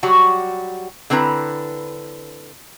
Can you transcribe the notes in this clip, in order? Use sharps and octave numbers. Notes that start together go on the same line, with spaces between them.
F#3 G3 F#4 G4
D3 C4 E4 B4 A#5